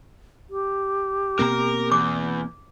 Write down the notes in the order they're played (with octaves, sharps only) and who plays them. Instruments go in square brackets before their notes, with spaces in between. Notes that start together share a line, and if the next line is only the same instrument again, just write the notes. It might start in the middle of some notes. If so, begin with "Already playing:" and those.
[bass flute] G4
[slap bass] B2 A#3 C4 [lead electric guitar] A#4 A#5
[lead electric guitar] E2 [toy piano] D6